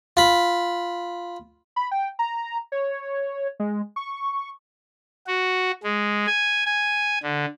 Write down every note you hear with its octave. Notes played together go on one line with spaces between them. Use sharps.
F4 B5
B5
G5
A#5
C#5
G#3
C#6
F#4
G#3
G#5
G#5
D3